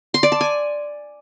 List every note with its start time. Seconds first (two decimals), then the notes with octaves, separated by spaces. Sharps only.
0.14 C6
0.23 D5
0.32 A5
0.41 G#5